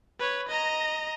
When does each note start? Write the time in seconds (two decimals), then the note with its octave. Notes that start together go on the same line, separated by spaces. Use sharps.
0.19 B4 C#5
0.49 D#5 A#5